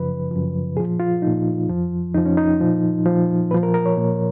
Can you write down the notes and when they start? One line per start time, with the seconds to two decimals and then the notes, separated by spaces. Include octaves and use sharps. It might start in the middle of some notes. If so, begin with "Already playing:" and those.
Already playing: F#2 C#3 F3 B4
0.31 F#2 C#3 F3
0.76 A#2 G#4
0.80 F3
1.00 F4
1.22 A#2 F3 D#4
1.68 F2 F3
2.14 F2 F3 D#4
2.26 C#4
2.37 D#4
2.60 A#2 F3
3.05 A#2 F3
3.51 A#2 F3 B4
3.63 A#4
3.74 A#4
3.86 C#5
3.97 A#2 F3